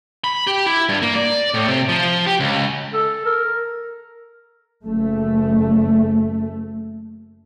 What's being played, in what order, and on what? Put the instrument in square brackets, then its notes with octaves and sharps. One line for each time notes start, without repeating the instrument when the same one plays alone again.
[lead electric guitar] B5
G4
E4
G2
A#3
D5
A2
C3
F3
G4
C#2
[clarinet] A4
A#4
[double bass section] F#1 A3